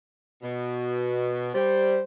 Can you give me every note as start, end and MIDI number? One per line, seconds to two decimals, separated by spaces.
0.42 1.50 47
1.55 1.98 55
1.55 2.04 72